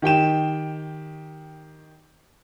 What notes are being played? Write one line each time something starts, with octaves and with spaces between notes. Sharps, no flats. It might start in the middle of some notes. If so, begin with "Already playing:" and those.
D#3 G4 G5 E7